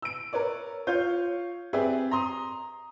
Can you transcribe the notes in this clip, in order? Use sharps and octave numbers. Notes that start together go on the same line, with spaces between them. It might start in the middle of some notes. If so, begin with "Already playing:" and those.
E6 D7
A#4 B4 C#5 D5
F4 C#5 G6
C4 G4 G#4 B4 D5 E5
A#5 C6 D#6